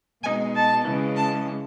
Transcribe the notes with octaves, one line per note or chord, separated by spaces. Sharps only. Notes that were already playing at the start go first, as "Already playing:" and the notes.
B2 G#3 D#4 G#5
A5
C#3 E3 G#3 C#4
A5